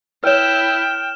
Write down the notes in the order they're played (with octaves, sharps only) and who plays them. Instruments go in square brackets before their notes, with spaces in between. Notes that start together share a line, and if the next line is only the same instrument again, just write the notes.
[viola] E4 [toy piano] B4 C#5 [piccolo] G5 [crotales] F6 E7